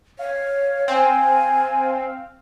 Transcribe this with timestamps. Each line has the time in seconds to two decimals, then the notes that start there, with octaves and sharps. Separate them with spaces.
0.19 C#5 F5
0.88 C4 G#5